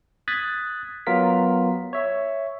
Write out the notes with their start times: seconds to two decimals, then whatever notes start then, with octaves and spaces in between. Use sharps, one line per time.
0.28 D#6 F#6 G#6 A6 B6
1.07 F#3 B3 F4 A#4 B6
1.93 C#5 E5